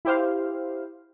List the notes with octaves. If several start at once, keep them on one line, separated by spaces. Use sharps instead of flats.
E4 G4 C5 F5